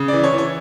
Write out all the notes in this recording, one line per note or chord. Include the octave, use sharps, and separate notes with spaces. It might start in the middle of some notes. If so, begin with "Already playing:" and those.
Already playing: C#3
E3 D5
C#5
E3
C#5